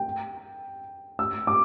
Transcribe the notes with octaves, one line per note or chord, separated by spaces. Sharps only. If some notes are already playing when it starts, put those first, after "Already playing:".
Already playing: G5
E6
D6